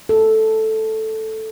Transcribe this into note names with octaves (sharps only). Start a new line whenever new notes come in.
A4